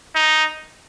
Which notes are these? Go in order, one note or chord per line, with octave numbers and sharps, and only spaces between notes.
D#4